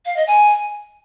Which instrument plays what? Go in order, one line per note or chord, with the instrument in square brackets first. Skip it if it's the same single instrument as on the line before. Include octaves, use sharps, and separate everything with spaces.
[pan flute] F5
D#5
G#5